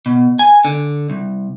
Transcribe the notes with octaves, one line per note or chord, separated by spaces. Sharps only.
B2
G#5
D3
C2